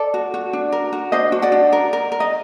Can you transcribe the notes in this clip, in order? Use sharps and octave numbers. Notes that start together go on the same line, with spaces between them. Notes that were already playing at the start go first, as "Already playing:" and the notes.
Already playing: A4 D5
F#4
F#4
D4
A#4
F#4
D4 C5 D#5
F#4
D5 F#5
D4
A#4
A#4
A#4
D#5